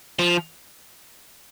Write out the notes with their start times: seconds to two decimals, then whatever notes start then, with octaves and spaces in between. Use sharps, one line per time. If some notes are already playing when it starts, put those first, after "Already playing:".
0.19 F3